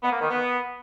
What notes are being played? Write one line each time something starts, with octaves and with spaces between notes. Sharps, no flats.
B3
A#3
D#3
B3